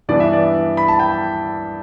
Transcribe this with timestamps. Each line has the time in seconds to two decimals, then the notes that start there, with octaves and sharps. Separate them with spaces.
0.09 G2 E3 B3 D4 D5
0.20 E5
0.33 D5
0.77 B5
0.88 A5
0.99 G5